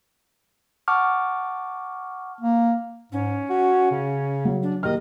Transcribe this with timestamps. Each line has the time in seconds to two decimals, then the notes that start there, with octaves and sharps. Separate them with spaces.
0.88 F#5 A5 C#6 D6 F6
2.41 A#3
3.12 G#2 C#4
3.50 F#4
3.91 C#3
4.45 F#3
4.63 D4
4.83 D#2 D#3 G4 D#5 F6